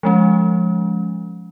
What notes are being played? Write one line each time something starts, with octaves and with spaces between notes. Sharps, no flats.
F3 G#3 C#4